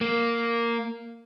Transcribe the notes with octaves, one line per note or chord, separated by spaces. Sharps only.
A#3